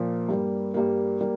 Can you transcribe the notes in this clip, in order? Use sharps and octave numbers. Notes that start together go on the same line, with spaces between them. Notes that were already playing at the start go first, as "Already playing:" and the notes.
Already playing: A#2 F3 A#3
G2 G3 A#3
G2 G3 A#3
G3 A#3